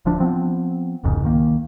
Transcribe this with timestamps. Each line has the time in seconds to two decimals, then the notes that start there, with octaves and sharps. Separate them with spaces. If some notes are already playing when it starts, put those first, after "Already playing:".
0.05 D1 D2 F3 D4
0.20 F3 B3 C4
1.04 E1 C2 G#2 C#3
1.24 C2 D#3 A#3